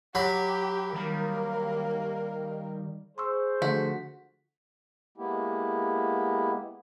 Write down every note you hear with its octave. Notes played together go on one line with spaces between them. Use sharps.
F#3 G4 B5
D#3 G3 A#3 A#4
G#4 C5 C6 C#6 E6
D3 F3 A3 F#4 B6
G#3 A#3 B3 E4 G4